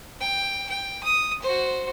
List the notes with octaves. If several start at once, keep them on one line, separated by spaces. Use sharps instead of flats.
G5
G5
D#6
F#4 C5